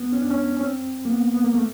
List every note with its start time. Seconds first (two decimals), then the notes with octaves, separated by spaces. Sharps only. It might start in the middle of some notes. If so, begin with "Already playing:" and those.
Already playing: B3
0.13 C#4
0.22 D4
0.31 C#4
0.57 C#4
0.61 C4
1.05 A#3
1.10 B3
1.34 B3
1.44 A#3
1.54 A3